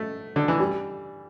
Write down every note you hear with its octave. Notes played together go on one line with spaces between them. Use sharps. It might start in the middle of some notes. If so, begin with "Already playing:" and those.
Already playing: A3
D3
E3
G3